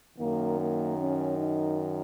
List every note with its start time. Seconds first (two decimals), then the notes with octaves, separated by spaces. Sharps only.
0.18 F#2 D#3 A#3
0.58 A#3
0.97 C#4
1.37 D#4